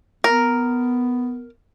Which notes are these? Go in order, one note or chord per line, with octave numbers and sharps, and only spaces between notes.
B3 A#4